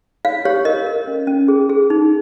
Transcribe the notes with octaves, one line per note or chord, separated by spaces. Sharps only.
C#5 F5
G4 C#5
A#4 D#5
A#4
C#4
C#4
G#4
G#4
D#4